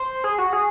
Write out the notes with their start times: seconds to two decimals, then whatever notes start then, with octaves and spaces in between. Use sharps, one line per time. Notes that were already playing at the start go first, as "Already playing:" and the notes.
Already playing: C5
0.24 G#4
0.38 F#4
0.53 G#4